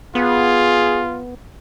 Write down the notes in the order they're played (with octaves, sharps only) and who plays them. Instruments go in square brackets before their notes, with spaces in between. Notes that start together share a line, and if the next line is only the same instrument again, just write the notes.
[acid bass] B3 [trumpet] F4 [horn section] G#4